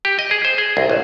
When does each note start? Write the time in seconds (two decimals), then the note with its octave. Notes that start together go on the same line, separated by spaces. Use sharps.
0.05 G4
0.19 D#5
0.31 G#4
0.45 C5
0.58 G#4
0.77 C2
0.90 A1